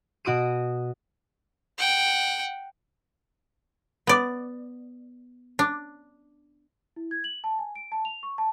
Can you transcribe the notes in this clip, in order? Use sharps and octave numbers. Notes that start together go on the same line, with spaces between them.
B2 F#4 D#6 D7 D#7
F#5 G5
B3 D5
D4
E4
G#6
F#7
A5
G#5
D7
A5
F7
C#6
A5